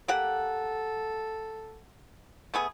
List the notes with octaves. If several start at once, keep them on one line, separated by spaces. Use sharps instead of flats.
A#3 G4 A4 F#5
A3 B3 G#4